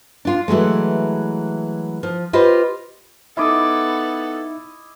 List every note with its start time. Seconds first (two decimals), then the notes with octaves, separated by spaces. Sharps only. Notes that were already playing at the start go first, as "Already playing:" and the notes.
0.25 D4 F4
0.48 E3 F#3 G#3 A3
2.03 F3
2.33 F4 G4 B4 C5 D#5
3.37 B3 D#4 E4 A4 D#5 E5 D6